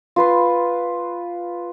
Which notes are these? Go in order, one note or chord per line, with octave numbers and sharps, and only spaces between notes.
F4 B4 C6